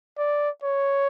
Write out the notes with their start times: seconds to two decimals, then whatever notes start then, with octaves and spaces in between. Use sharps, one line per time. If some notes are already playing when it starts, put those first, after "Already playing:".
0.18 D5
0.63 C#5